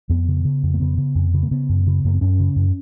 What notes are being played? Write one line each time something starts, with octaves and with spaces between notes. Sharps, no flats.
F2 B3
C#3
C#3
F2
A#3
C#3 B3
C#3
F2
C#3
A#3
C#3 B3
F#2
C#3
F#2 A#3
B3
F#2 C#4
C#3
F#2